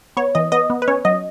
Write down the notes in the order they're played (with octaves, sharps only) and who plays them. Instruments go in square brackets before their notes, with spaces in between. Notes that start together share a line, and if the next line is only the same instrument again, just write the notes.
[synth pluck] B3 C#5
E3 D#5
B3 D#5
B3
B4
C#4 C#5
F#3 D#5